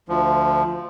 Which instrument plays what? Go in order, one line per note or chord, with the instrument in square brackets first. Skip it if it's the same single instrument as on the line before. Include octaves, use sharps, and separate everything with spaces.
[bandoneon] D2 F3